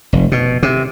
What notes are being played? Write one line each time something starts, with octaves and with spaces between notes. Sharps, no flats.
F1
B2
C3